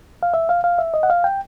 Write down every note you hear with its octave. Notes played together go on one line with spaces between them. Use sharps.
F5
E5
F5
F5
E5
D#5
F#5
F5
G5